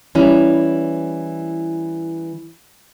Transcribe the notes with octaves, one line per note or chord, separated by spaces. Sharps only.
E3 G3 C#4 E4